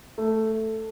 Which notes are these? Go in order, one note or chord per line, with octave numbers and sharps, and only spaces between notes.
A3